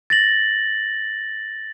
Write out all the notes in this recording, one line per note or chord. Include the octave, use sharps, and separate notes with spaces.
A6 A#6 F#7